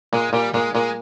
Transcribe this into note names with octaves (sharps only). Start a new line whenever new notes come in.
A#2 G#3
A#2 G3
A#2 G#3
A#2 G#3